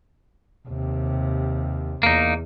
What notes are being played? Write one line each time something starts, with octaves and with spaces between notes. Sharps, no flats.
D#2 C3
E2 A#3 D#4